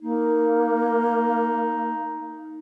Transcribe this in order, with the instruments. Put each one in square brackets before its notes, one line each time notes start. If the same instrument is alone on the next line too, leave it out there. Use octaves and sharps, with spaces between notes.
[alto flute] A#3 [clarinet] D#4